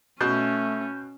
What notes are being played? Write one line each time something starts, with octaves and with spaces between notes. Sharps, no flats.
B2 A3 C#4 G6